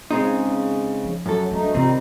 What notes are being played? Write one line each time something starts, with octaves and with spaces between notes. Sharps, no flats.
C#3 G#3 C4 D#4
F3
F#2 F#3 A4
D2 G3 A3 D#4
C3 D#3 G3 C4 D#4 F4